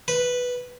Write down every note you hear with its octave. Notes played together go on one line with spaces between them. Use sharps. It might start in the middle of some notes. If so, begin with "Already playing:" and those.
B4